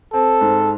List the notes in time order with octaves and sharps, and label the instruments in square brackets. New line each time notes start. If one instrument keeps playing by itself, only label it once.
[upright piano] C4 [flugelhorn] A4
[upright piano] G#2